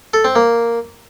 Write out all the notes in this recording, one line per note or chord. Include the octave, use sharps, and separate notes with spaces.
A4
C4
A#3